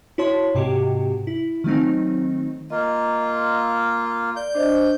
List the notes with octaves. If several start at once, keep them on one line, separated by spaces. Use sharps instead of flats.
E4 F#4 C#5 A5 C6
G#2 C3 F#4 G4
E4
D#3 F#3 A3 C4 D#4
A#3 F4 D#5 A#5 C6
E6
D5 G6
D4 C5 D#5